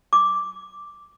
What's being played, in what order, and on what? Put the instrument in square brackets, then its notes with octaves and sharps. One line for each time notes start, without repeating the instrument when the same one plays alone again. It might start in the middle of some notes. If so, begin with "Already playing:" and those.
[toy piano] D6